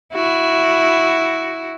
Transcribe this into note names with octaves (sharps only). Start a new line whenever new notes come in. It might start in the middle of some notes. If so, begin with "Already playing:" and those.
E4 F#4